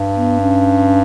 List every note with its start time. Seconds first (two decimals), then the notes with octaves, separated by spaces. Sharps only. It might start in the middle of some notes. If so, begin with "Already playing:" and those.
Already playing: G2
0.16 B3
0.41 C#4